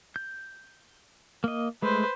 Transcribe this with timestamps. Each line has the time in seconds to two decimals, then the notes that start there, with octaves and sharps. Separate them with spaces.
0.16 G6
1.44 A#3 D#5
1.82 G#3 A3 B4 C5